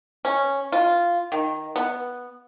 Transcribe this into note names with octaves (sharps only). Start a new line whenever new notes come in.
C#4
F4
D#3
B3